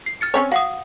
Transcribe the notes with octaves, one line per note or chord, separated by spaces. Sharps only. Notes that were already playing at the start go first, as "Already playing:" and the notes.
C7
F6 A6 C#7
C4 C#4 C#5
F#4 F5 F#5 D#6